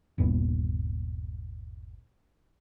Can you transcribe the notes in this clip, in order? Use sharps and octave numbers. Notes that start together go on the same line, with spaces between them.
G1 D#2 A#2 B3